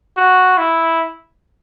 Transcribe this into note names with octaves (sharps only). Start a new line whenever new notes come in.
F#4
E4